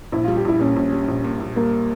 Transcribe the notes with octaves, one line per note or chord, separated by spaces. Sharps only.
A#1 E4
F4
G3
G4
A#1 E4
A#2 C#4
A#1
G3
A#1
A#2
A#1
G3 A#3